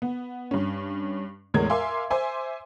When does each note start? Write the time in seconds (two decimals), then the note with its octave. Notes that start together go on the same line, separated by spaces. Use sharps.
0.02 B3
0.51 G2 C#4
1.54 E2 A2 G#3 A#4 C#5 G#6
1.70 A#4 E5 F5 G#5 C6 D6
2.10 C5 E5 G#5 C6 D6